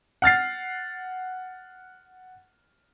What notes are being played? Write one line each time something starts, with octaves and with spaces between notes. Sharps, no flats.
F#5 F6 A6 C7